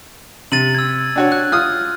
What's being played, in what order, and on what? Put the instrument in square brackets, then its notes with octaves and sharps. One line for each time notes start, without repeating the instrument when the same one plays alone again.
[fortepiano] C3 [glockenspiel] A6 D#7 F#7
[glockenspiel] E6 G#6
[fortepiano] D4 F#4 C#5
[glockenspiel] F#6
[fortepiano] F4 D#6 [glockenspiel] F6